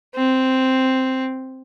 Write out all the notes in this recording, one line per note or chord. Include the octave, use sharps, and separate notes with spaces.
C4